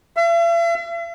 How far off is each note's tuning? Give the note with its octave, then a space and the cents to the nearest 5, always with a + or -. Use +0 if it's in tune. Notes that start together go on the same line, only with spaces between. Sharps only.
E5 +45